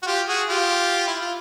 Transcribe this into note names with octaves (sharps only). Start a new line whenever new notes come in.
F#4
F4 G4
F#4 G#4
F4 G4
E4
F4